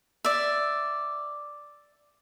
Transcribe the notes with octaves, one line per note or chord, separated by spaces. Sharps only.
D5 E5